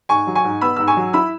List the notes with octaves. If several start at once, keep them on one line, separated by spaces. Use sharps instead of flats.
G#2 G#5 C#6
F#3
G#5 C#6
G#2
B3 B5 E6
G#2 E6
G#5 C#6
F#3
E4 B5 E6